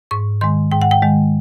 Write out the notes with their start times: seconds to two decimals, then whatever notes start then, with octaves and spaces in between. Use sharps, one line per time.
0.11 G#2 C#6
0.41 D#3 G#3 C6
0.72 G#2 G5
0.82 F#5
0.91 G5
1.02 D#3 G#3